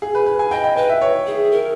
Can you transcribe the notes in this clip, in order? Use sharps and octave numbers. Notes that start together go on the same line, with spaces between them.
G#4
B4
B4
G#5
D#5 G5
G5
B4 G5
E5
C#5
G#4
A#4